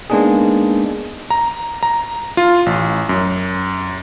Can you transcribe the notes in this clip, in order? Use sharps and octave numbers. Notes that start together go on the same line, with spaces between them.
G#3 A#3 B3 D4 D#4 G#4
A#5
A#5
F4
A1
F#2